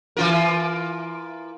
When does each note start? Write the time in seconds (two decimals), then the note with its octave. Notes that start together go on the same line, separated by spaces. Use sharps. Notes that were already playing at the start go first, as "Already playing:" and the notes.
0.17 E3 F4 A#4